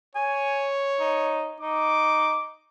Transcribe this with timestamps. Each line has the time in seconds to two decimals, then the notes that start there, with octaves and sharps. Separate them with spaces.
0.16 C#5 G#5
1.00 D#4
1.61 D#4 D6